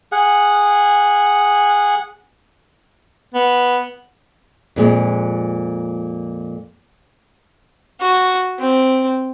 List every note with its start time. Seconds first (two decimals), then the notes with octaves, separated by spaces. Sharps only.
0.12 G#4 F#5
3.35 B3
4.76 F2 A#2 G#3
8.00 F#4
8.59 C4